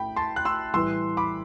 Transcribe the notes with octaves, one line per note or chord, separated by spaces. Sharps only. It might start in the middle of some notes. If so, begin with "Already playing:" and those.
Already playing: A2 G5 B5
A5 C6
F#6
C6 E6
A2 E3 G3 C6 E6
B5 D6